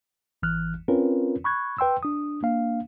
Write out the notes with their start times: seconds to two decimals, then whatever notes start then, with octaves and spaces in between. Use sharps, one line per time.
0.43 G#1 E3 F6 F#6
0.88 C4 C#4 F4 A#4 B4 C#5
1.44 B5 C#6 F#6 G#6
1.78 B4 G5 C6 E6
2.03 D4 D#6
2.43 A#3 D4 F5